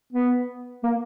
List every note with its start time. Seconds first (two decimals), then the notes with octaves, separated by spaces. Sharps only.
0.13 B3
0.84 A#3